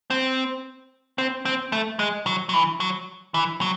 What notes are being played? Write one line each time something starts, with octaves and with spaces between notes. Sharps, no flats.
C4
C4
C4
A3
G#3
F#3
F#3
E3
F#3
E3
F#3